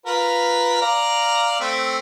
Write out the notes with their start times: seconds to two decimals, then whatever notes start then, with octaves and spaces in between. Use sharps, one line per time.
0.06 F4 A#4 B4
0.81 D5 F5 A#5
1.60 A3 C4